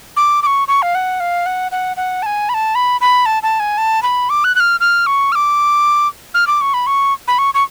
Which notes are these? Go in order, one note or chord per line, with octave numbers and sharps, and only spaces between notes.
D6
D6
C#6
C#6
F5
F#5
F5
F#5
F#5
F#5
A5
G#5
B5
A5
B5
B5
A5
A5
G#5
A5
B5
D6
F#6
F#6
F6
F6
C#6
F6
D6
F6
D6
C#6
B5
C#6
B5
C#6
C#6